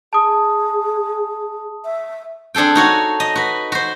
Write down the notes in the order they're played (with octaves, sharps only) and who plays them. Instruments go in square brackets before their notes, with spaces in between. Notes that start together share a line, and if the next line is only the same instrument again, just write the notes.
[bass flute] G#4 [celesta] A5 D#6
[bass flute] E5
[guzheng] C4 D4 G#4 A4 G5
D#4 F#4 C#5
D#5
F#4 B4
F#4 C5